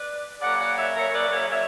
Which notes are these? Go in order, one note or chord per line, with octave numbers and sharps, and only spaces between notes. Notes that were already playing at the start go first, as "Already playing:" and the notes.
Already playing: B4 D5
C#3 F#3 A#3 D5 F#5
D5 F#5
C#5 E5
A#4 C#5
B4 D5
C#5 E5
C#5 E5